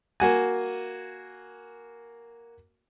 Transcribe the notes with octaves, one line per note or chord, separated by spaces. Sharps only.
A#3 F#4 G#5